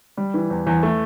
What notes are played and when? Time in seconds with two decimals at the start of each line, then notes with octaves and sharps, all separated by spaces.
0.17 G3
0.34 E3
0.50 E2
0.67 E2
0.83 A3